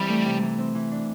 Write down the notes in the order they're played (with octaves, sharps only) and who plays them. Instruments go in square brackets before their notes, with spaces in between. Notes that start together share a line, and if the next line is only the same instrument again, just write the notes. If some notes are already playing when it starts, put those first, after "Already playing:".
Already playing: [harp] E3 C4 [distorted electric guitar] G3
[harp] A3
C3
E3
C4
E3
D4